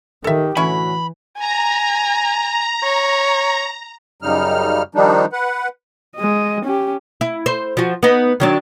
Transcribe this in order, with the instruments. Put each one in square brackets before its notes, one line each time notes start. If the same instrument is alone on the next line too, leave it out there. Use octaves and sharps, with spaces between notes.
[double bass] D#3 [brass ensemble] G4 [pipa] A4 E5
[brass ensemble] A2 D3 F#4 [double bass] E3 [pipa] C#4 E4 C#6 [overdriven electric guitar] B5
[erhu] G#5 [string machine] A#5
[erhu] C#5
[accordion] F#2 C#3 G3 D#4 F6
D#3 F3 G3 D4 D#4
B4 F#5
[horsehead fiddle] G#3 D#5
C#4 G4
[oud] E4
C5
F3 F#4
B3 D#4
D#3 F#3 D4